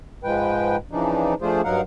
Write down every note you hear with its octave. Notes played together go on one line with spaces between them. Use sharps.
G#2 F3 G#3 B4 G5
C#3 E3 F3 D4 D#4
F3 A3 D4 F4 G#4 C5
G2 F#3 D#4 A#4 F5 F#5